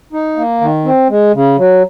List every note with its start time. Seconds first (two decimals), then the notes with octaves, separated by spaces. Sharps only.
0.13 D#4
0.37 A#3
0.61 D#3
0.85 C4
1.09 G#3
1.34 C#3
1.58 F#3